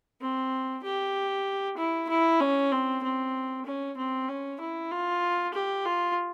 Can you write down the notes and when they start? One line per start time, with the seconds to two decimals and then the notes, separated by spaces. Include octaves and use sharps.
0.21 C4
0.84 G4
1.78 E4
2.09 E4
2.40 C#4
2.72 C4
3.03 C4
3.66 C#4
3.98 C4
4.29 C#4
4.60 E4
4.91 F4
5.54 G4
5.85 F4